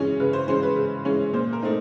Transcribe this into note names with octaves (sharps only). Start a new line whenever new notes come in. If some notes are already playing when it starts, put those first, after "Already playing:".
Already playing: C#3 E3 G#3 C#4
C#3 B4
C5
E3 G#3 C#4 C5
B4
C#3
E3 G#3 C#4
A#2 C5
A#4
A3 C4 D#4